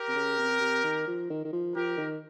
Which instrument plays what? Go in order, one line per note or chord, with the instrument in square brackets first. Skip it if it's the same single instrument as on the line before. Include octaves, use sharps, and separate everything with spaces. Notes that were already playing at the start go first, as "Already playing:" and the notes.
Already playing: [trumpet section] G4 A#4
[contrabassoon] C3
C#3
C3
C3
D#3
F3
D#3
D#3
F3
[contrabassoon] F3 [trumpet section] G4 A#4
[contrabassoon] D#3